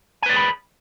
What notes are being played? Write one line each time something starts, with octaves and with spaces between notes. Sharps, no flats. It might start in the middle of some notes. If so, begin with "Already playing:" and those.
G#4 B4 D5 G#5 B5